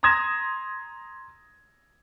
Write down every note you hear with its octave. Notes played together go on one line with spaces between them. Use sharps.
A#5 C6 D#6 G#6 A#6 E7